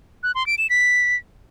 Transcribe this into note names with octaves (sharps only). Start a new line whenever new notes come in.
F#6
C6
D7
E7
B6